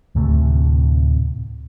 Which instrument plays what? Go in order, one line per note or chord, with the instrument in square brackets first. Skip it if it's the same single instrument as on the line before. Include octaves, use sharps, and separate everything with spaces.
[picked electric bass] D2 A2 C3 A3